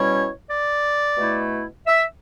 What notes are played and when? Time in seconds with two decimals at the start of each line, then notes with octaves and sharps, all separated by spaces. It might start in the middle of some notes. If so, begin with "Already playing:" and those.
Already playing: B2 G3 C#4 E4 C#5
0.50 D5
1.17 B2 A3 E4
1.87 E5